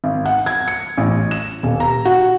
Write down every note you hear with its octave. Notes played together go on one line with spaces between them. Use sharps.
G#1
F#5
G#6
C#7
A1
E7
D#1
A#5
F#4